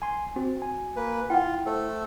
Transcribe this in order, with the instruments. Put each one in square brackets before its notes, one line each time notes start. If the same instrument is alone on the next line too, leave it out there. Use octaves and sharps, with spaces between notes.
[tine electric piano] G#5 C6
[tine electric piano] C4 [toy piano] F#4
[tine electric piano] G#5
[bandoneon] A#3 B4
[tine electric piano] E4 [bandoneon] F4 [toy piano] F#5 G5
[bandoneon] A3 A4 [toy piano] C5